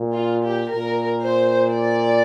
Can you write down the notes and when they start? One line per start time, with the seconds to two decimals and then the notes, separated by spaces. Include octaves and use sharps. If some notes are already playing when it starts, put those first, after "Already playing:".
Already playing: A#2
0.13 F4
0.45 G4
0.75 A#2 A#4
1.22 C5
1.69 D5